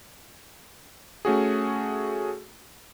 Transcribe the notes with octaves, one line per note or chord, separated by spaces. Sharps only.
A3 C#4 F#4 G#4